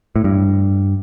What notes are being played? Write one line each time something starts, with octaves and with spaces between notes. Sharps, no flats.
A2
G2